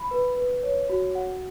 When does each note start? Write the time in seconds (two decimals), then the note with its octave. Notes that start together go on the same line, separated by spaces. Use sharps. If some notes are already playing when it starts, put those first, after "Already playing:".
Already playing: B5
0.11 B4
0.37 B4
0.63 C#5
0.89 F#4
1.15 F#5